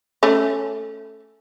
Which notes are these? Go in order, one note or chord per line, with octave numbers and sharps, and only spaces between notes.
A3 C#4